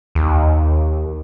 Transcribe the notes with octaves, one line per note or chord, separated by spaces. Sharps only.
D#2